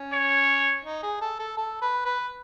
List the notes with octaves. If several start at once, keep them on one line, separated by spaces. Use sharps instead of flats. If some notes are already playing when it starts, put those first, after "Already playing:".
Already playing: C#4
C#5
D#4
G#4
A4
A4
A4
B4
B4